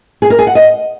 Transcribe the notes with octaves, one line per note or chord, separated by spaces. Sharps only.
G#4
A#4
G#4
F#5
D#5